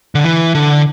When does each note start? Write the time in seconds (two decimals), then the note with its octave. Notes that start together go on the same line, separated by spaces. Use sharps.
0.15 D3
0.24 E3
0.55 D3